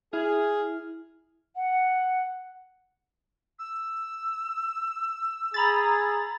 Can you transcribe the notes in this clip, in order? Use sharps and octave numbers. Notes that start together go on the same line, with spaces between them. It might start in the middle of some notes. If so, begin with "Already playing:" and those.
E4 G#4 F6
F#5
E6
G#4 A#5 B5 A6